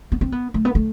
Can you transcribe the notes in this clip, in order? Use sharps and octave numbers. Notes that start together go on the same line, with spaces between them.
B3
C4
B3
A3
B3
A3